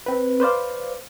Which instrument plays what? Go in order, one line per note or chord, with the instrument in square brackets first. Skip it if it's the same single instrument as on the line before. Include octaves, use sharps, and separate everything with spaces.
[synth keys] C4 B4
B4 C5 D5 F5